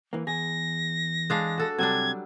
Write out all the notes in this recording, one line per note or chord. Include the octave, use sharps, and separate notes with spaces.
E3 A#3
E2 G#4 A#6
G#3 D4 F5
F#4 A4
C3 F#3 G3 D4 G#6